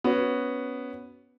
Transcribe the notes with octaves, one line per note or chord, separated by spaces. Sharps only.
B3 C#4 F#4